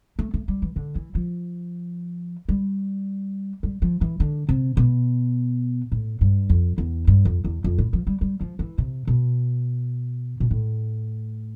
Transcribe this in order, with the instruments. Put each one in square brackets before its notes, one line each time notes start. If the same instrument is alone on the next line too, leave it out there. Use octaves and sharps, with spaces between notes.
[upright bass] A3
A3
G3
E3
D3
E3
F3
G3
G3
F3
E3
D3
C3
B2
A2
G2
F2
E2
G2
F2
E2
F2
A2
F3
G3
G3
F3
E3
C3
B2
B2
A2